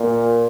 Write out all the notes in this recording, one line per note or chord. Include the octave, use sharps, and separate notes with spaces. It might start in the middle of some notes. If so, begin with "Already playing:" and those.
Already playing: A#2